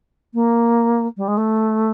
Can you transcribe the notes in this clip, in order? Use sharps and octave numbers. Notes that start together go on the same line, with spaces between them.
A#3
G3
G#3
A3